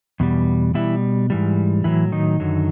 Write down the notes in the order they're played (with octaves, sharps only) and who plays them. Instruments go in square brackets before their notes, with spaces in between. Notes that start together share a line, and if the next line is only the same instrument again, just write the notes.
[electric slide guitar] E2 B2 G3
B2 E3 G3 E4
G#2 E3 G3
A2 E3 F#3 E4
D#3 D#4
F#2 D3 F#3